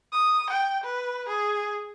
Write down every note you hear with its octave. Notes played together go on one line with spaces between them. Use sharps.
D#6
G5
B4
G#4